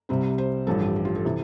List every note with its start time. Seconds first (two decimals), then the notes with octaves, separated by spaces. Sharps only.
0.09 C2 C3 G3 C4
0.38 C5
0.67 A1 G2 F3 A4
0.81 G4
0.96 G4
1.05 F4
1.16 A4
1.25 C3 E3